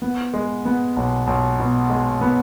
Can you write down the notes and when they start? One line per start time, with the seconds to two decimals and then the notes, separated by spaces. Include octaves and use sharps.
0.02 B3
0.34 G#3
0.65 B3
0.97 B1
1.27 B1
1.60 B2
1.90 G#3
2.21 B3